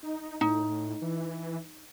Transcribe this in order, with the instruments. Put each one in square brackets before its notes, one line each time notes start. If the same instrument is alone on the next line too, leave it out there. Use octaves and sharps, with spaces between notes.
[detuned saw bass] D#4
[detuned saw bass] A2 [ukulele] D#4
[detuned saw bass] E3